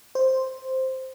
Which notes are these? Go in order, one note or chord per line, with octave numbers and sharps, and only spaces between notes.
C5